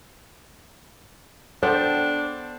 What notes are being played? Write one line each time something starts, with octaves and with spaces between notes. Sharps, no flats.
B3 D4 A4 B4 C5 G5